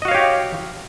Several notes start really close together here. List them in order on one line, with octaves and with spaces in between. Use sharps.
D#5 F#4 F5 C#5 G4